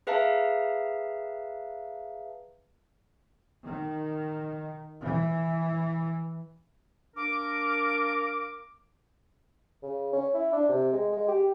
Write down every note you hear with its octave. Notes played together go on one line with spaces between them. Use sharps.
G#4 B4 E5 F5 A5 A#5
D#3
E3
A#3 D4 A#4 D6
C#3
C#4
E4
D4
C3
G#3
G#3
G4